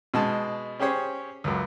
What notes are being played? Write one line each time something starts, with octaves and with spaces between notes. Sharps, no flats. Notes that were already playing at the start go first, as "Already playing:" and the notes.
B2 G#3 A5
C#4 G4 G#4 C5 C#5
C#2 F#2